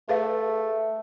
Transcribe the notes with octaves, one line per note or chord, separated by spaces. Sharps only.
A3 G#4 B4 F5